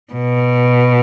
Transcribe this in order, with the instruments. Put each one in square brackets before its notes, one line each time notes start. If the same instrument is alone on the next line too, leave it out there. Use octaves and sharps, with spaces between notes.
[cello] B2